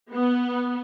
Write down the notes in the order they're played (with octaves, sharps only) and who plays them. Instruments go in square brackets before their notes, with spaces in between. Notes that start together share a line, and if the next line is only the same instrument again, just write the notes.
[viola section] B3